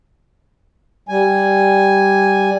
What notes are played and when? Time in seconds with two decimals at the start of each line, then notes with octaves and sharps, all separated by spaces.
1.09 G3 G#5